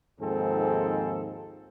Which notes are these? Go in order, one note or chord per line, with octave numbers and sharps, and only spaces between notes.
D#2 G#2 F3 C4 G#4 A4